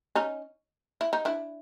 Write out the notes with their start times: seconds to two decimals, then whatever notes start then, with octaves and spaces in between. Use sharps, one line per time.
0.15 C#4 D#4
1.01 E4
1.13 D#4
1.25 D4 E4